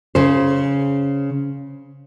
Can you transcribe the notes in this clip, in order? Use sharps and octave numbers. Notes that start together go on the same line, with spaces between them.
C#3 C5